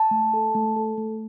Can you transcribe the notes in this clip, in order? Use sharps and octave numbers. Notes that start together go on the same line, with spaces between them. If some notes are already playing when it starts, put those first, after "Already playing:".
Already playing: A5
A3
A4
A3
A4
A3